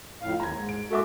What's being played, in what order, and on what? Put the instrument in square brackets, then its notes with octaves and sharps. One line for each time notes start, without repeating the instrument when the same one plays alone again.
[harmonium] F2 A2 F5
[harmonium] D#2 [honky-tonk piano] A#5 G#6
[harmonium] G#2
[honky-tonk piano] D7
[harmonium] G#3 F#4 [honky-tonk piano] A4 E5 D6